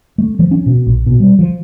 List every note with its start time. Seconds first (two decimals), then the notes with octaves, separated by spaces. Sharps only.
0.18 A3
0.39 F3
0.51 C#4
0.66 B2
0.87 A#1
1.06 B2
1.20 G3
1.39 F3